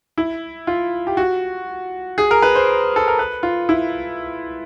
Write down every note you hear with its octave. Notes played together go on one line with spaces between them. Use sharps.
E4
F4
G4
F#4
G#4
A#4
B4
C5
A4
A#4
B4
F4
E4